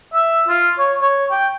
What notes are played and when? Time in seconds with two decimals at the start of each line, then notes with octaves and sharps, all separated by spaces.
0.14 E5
0.48 F4
0.78 C#5
1.02 C#5
1.31 G5